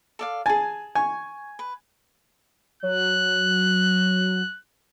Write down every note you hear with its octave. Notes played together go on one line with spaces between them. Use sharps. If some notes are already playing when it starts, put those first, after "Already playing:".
A4 D5 F5
G#4 G#5 A5
G#5 C#6
B4
F#3 F#6